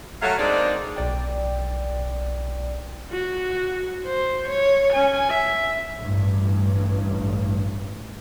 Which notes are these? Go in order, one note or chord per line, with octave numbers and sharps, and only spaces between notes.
F#3 A3 F5
G#3 A#3 C4 D4 D#4 D5
B1 D5 G5
F#4
C5
C#5
C#4 G#5
E5
A1 G2